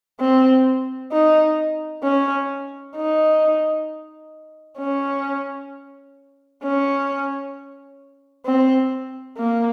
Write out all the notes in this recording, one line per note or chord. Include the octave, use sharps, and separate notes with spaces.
C4
D#4
C#4
D#4
C#4
C#4
C4
A#3